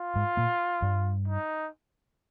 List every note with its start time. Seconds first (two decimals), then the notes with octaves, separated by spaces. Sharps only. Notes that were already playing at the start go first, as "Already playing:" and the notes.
Already playing: F4
0.16 G#2 G#3
0.37 A#2 A#3
0.82 G2 G3
1.28 D#4